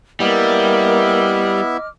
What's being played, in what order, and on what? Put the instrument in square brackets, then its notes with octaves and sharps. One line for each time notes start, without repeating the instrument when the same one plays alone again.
[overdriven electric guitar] G3 [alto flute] A#3 [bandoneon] B3 E4 E5 [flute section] D#5 D6 F6